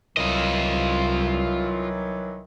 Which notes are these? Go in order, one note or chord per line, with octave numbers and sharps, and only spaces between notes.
C2 D#3 E3 F#3 F4 D#5